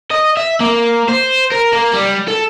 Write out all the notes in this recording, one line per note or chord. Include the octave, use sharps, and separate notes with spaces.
D#5
E5
A#3
C5
A#4
A#3
G3
A4